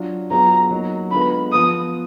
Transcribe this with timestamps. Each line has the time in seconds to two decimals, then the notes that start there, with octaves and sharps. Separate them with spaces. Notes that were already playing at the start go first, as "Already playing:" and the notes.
Already playing: F#3 D4 F4
0.30 F#3 B3 F4 G#4 A#5
0.71 F#3 A#3 D#4
1.11 D3 G#3 B3 F4 B4 B5
1.52 F3 B3 F4 D#6